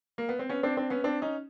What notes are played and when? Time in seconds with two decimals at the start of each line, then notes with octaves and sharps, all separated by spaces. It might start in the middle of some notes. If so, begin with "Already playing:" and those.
0.18 A#3
0.29 B3
0.39 C4
0.49 B3 C#4
0.63 C4 D4
0.77 C4 D4
0.90 B3 C#4
1.04 C4 D4
1.22 C#4 D#4